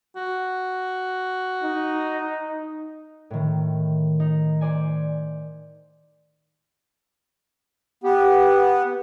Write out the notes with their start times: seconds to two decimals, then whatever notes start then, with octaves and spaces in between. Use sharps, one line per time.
0.16 F#4
1.63 D#4
3.30 A2 D#3
4.20 D#4
4.61 C5 D5 G#5
8.04 B3 G4